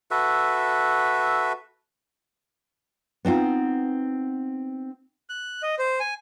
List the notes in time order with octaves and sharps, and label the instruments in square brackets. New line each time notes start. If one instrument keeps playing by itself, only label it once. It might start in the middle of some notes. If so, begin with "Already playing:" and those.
[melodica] F#4 A4 B4 E5
[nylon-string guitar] B3 C4 D#4 F4
[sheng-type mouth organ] F#6
D#5
C5
G#5